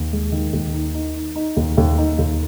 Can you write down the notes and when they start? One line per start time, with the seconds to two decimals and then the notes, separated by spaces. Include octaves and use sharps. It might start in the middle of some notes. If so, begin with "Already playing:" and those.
Already playing: D#2
0.13 G#3
0.32 D#3
0.53 D#2
0.74 D#4
0.94 D#4
1.16 D#4
1.36 D#4
1.57 D#2
1.77 D#2
1.98 D#4
2.18 D#2